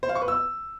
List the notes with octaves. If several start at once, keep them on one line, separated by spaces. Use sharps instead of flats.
C5
F5
C#6
B4
E6